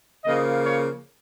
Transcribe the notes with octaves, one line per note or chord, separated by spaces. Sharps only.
C#3 F3 A#3 D#5
C#5